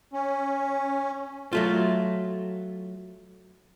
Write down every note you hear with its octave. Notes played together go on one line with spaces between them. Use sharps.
C#4
F#3 A3 F4